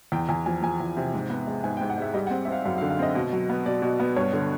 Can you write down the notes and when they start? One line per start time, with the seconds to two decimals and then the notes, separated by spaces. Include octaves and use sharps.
0.12 E2 G5
0.29 E2 G#5
0.46 F3 G#5
0.63 F3 G#5
0.80 E2
0.97 C3
1.14 G#2
1.30 B3
1.47 G#3
1.64 G#2 G#5
1.77 G5
1.81 G#2
1.90 F#5
1.98 G#3 E5
2.14 G3 D#5
2.27 F#5
2.31 C4
2.45 E5
2.48 C4 F5
2.65 F#2 F5
2.78 F5
2.82 D3
2.90 F5
2.99 C4 D#5
3.15 B2
3.33 F#3
3.50 B3
3.66 B2 D5
3.82 B2
4.00 B3
4.16 G2 C#5
4.33 D3